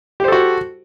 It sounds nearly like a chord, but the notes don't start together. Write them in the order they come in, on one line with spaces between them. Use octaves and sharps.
G4 C5 A4 F#4